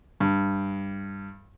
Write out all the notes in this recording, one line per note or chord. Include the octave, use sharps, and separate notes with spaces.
G2